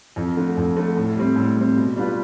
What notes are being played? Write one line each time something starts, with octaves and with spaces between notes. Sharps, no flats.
F2
D3 A3
F2
D3 A3
A2
G3 C4
A2
G3 C4
B2
G3 D4 F4 B4